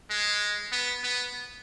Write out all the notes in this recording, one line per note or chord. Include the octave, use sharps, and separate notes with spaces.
G#3
B3
B3